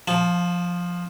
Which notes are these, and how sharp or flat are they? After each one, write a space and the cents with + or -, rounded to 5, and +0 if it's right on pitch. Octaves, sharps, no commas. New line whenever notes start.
F3 +10 A5 -30